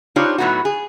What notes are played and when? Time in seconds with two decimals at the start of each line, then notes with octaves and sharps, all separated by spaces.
0.16 D4 D#4 F4 G4 C5 C#5
0.38 A2 F#3 B3 D#4 F#4
0.65 G#4